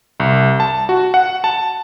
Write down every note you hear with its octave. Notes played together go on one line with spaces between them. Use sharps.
C2
A5
F#4
F#5
A5